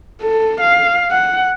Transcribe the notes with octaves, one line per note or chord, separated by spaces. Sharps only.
A4
F5
F#5